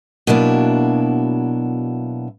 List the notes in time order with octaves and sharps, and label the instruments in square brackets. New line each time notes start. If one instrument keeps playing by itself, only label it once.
[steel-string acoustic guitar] B2 F#3 A#3 D4 E4